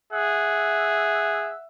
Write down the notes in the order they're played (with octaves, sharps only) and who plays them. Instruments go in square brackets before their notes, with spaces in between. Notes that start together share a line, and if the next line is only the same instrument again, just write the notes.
[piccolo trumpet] G#4 [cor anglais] E5 [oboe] F#5